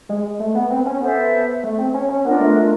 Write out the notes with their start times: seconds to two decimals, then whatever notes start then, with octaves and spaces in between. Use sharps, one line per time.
0.09 G#3
0.40 A3
0.55 B3
0.70 C4
0.86 C#4
1.01 B3 A4 C5 E5
1.63 A3
1.78 C4
1.94 C#4
2.09 C#4
2.25 B3 D4 F4 A#4 D#5
2.40 A3
2.56 A3